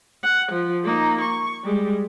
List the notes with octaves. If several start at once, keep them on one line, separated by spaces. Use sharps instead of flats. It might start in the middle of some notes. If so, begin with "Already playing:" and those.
F#5
F3
A#3 D#4
C#6
G3 G#3